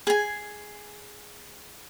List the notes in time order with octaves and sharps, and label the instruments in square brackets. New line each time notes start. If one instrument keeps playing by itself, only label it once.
[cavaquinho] G#4 G#5